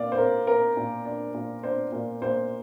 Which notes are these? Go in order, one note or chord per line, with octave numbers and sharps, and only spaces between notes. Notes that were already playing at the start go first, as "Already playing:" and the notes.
Already playing: A#2 D5 F5
C5
A#2 A#4
A#3 A#4
A#2
D4
A#2
D4 C5
A#2
A#2 C5